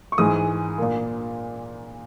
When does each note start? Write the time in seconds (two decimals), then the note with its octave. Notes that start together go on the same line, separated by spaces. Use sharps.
0.12 C#6
0.18 G#2 E3 G#3 D#6
0.78 A#2 A#3